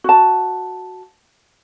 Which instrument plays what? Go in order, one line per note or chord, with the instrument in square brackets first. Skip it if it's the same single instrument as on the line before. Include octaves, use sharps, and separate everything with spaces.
[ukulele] F#4 A5